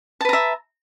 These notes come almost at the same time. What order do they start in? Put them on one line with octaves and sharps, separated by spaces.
A5 B4 A#5 E5